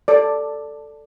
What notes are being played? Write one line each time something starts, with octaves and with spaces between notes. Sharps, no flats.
A4 D5